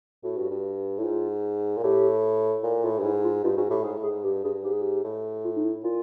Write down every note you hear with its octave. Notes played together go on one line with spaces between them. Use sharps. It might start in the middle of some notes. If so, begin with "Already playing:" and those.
A2 F#4
G2
G2
A2 E4
G#2 F4
A#2
A2 G4
A#2
A2 F4
G2
G#2 E4
F4
G2 F4
G#2 F#4
A2 G4
G#2 G#4
A2
G#4
G#2
G2 G4
G2 G#4
G2
G#2 G4
G#4
G4
A2
F4
D#4
E4
A#2 F4